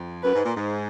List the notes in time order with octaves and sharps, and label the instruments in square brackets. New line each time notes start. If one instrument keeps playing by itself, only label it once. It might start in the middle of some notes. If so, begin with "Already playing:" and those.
Already playing: [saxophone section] F2
[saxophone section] F#2 [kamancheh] B4
[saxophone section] G#2
A#2
G#2